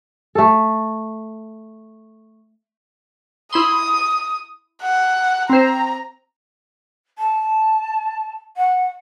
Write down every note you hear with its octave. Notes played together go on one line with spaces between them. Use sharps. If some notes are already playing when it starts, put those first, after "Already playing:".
A3 A4
E4 B5 C6 D#6
F#5
C4 C5 A#5
A5
F#5